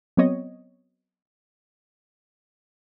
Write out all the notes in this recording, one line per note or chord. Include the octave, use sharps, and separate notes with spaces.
F#3 B3 C4 C#5 D#5